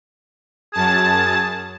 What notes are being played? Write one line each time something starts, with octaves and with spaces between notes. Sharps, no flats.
F#2 G#4 A5